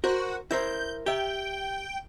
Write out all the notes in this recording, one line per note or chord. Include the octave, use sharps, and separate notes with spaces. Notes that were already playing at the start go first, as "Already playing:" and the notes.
F#4 A#4 C5
E4 A#4 C5 G6
G4 E5 G5